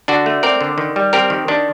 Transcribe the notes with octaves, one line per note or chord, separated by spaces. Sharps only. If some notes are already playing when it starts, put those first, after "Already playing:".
D3 D4 F#4
A3
C4 A#4 D5
D3
D#3
G3
C4 G4 A#4
D#3
D#3 D4